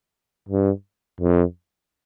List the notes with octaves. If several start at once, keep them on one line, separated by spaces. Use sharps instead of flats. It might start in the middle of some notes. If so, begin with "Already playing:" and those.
G2
F2